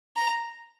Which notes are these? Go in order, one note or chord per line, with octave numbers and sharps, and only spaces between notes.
A#5